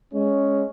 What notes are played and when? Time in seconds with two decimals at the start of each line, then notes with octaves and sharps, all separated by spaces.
0.13 G#3 C#4